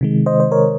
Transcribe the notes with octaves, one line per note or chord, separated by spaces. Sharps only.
C3 D#3 G#3
C5 D#5
C5
A#4 C#5